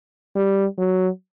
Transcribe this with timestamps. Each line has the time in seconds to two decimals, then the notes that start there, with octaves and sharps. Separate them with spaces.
0.35 G3
0.78 F#3